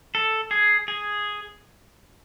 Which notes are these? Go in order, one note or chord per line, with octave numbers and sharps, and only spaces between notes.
A4
G#4
G#4